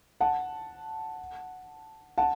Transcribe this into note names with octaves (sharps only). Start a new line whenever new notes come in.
F#5 A5
F#5 A5